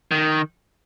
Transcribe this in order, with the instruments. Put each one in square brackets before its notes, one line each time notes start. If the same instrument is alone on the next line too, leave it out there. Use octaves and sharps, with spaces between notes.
[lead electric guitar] D#3